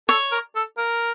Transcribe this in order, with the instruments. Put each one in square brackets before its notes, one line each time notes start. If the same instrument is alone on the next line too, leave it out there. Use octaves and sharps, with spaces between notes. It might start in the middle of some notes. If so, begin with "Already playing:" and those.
[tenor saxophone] A4 [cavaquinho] C#5
[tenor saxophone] A#4
A4
A#4